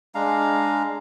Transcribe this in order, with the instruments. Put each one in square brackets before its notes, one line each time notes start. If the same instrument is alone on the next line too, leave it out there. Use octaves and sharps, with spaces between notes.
[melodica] G#3 D4 F5 A#5